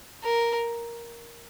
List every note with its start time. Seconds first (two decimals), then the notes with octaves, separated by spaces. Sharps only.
0.23 A#4